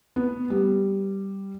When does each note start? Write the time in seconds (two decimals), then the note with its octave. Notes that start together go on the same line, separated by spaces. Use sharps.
0.16 B3
0.50 G3